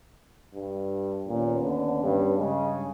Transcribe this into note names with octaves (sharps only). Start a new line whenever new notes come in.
G2
D#2 A#2 B3 C#4
D3
G2
G2 C#3 G#3